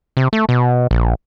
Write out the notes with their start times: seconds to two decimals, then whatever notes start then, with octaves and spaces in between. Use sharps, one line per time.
0.17 C3
0.33 A3
0.49 B2
0.91 A#1